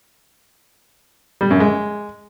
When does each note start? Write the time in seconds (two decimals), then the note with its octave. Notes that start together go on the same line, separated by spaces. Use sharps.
1.41 G3
1.50 F#2
1.60 G#3